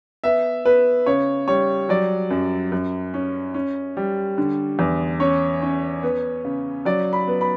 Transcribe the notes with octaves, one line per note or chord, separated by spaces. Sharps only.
B3 E5
B3 B4
C#3 C#5
G3 C#5
F#3 D5
F#2
F#2
C#4
C#4
G3
D3
E2
C#4 C#5
C#4
B3
C#3
F#3 D5
B5
B3
B5